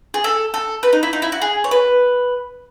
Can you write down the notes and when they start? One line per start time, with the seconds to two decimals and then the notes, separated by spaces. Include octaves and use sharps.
0.14 G#4
0.24 A4
0.54 A4
0.83 B4
0.93 D#4
1.03 E4
1.13 D#4
1.22 E4
1.32 F#4
1.42 G#4
1.64 C#5
1.71 B4